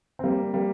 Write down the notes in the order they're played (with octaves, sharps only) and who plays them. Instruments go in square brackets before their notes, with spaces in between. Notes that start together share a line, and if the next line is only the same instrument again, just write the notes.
[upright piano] C4
G3 A#3
G3 A#3